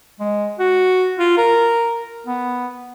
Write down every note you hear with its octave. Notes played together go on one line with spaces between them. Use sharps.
G#3
F#4
F4
A#4
B3